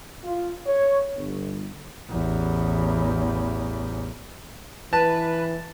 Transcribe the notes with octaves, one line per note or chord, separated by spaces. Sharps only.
F4
C#5
G1
A1 E2
E3 B4 A5